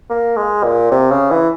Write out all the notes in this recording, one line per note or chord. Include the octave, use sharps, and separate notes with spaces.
A#3
G#3
A#2
C3
C#3
E3